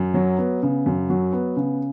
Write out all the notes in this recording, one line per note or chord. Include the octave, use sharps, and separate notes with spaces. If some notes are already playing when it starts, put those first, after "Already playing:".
Already playing: F#2
F#3
B3
C#3
F#2
F#3
B3
C#3